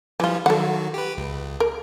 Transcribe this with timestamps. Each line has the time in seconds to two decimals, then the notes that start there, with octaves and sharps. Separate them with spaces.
0.20 E3 F3 G3 F4
0.46 D#3 F#3 A4 F#5
0.94 G4 B4
1.17 C#2
1.60 A#4